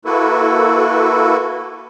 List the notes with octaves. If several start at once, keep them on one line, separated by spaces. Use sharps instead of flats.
A#3 E4 F#4 A4 B4